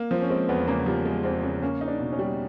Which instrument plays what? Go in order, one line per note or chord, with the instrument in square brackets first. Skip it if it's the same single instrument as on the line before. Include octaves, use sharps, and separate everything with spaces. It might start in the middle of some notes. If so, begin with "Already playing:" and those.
Already playing: [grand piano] A#3
[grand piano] F3 [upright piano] C4
[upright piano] C#4
[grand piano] G#3 [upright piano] C4
[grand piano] E2 [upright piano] B3
[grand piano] C#3 [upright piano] A#3
[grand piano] F3 [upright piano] G3
[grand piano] G#3
[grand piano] E2 [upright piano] C4
[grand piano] C#3
[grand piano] A#3 [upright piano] C#4
[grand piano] D#4
[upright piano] D4
[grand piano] B2
[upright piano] C#4
[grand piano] G3